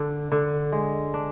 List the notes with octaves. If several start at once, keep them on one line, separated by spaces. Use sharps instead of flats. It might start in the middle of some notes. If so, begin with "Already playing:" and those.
Already playing: D3 D4
D3
G#3
D4